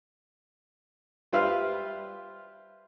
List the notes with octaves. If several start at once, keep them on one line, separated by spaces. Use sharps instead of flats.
G3 F4 B4 C5 E5 F6